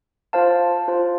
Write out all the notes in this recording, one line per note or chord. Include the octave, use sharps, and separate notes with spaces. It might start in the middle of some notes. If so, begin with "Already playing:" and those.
F4 C5 F5 A5
F4 C5 F5 A5